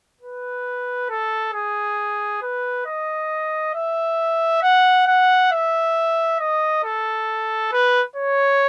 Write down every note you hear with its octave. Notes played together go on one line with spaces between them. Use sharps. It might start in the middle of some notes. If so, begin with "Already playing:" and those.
B4
A4
G#4
B4
D#5
E5
F#5
F#5
E5
D#5
A4
B4
C#5